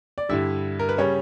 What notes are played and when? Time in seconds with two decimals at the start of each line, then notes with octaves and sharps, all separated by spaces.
0.18 D5
0.29 G2 D3 G3 E4 E5
0.79 A#4
0.89 B4
0.98 C#3 G3 C#4 C#5